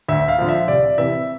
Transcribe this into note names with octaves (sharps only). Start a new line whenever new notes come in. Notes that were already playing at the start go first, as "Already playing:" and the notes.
D2 E5
F5
D3 F3
E5
C2 D5
C3 E3 E5